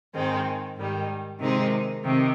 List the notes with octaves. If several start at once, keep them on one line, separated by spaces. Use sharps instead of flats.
G#2 D#3 G#3 C4
G#2 D#3 G3
C3 D#3 G#3 C4 D#4
C3 D#3